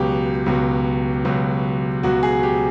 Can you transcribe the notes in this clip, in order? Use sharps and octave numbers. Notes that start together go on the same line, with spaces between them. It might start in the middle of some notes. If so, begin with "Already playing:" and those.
Already playing: C#2 B2 F#3 G4
C#2 B2 F#3
C#2 B2 F#3
C#2 B2 F#3 F#4
G#4
G4